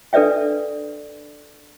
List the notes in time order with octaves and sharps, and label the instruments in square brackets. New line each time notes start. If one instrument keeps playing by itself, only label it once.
[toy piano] D4 A4 B4 D5 E5 G5